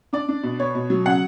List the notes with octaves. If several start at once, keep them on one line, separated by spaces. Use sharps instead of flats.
D4 D5
D4
B2
B3 C#5
B2
F#3
C#3 F#5